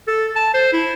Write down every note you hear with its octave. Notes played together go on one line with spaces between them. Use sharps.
A4
A5
C5
E4